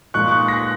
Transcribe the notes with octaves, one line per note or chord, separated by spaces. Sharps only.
A#2 G#3 D#4 C#6 F#6
C#6 F#6
F#6 A#6